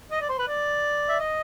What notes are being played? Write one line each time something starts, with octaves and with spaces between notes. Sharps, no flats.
D#5
D5
C5
B4
D5
E5
D#5